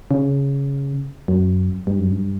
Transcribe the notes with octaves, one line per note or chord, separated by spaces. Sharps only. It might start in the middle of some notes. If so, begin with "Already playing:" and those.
C#3
F#2
G2
F#2
G2